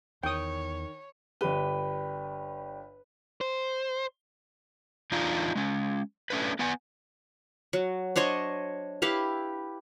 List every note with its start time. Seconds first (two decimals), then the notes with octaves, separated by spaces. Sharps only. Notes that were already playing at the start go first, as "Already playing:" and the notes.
0.23 E2 D#3 C#5 G5 D#6
1.41 G1 G4 B4 D5 G5
3.41 C5
5.12 E2 D4 D#4 F4 A#5
5.55 G#3 C#4
6.30 A3 C#4 D4 B4
6.59 B3 B4 F#5 G#5
7.73 F#3
8.16 D4 C5 C#5 D#5
9.02 E4 G4 B4 F5